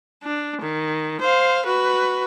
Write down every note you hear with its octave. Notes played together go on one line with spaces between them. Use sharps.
D4
D#3
C5 F5
F#4 B4